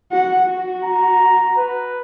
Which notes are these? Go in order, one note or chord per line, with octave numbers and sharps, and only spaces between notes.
F#4 F#5
F#4
A#5
B4